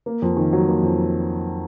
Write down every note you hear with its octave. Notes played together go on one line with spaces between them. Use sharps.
A#3
F2
D#3
F#3
A#3
F2